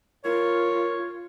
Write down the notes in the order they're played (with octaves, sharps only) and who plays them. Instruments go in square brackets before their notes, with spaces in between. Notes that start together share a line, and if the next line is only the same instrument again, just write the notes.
[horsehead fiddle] F4 [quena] A#4 [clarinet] C#5